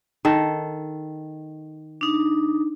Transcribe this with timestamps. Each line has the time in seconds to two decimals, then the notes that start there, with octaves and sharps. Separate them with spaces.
0.25 D#3 A4
2.01 D4 D#4